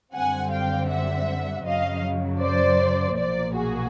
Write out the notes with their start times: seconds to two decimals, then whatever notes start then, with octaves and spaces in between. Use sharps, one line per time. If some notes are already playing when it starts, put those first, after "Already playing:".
0.13 F#2 D3 G3 C4 F#5 G#5
0.51 F5 G5
0.89 E5 F#5
1.65 F#2 C#3 F#3 D#5 F5
2.40 C5 D5
3.16 B1 A#2 F3 A#3 C5 D5
3.54 F#4 G#4